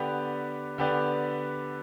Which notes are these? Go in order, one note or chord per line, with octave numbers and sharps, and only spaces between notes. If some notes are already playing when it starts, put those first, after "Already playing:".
Already playing: D3 B3 G4 B4 D5
D3 B3 G4 B4 D5